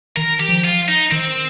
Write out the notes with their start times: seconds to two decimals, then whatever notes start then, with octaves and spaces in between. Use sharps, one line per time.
0.16 D#3 A#4
0.40 G4
0.49 F3
0.64 F4
0.88 D#4
1.11 D#3 C4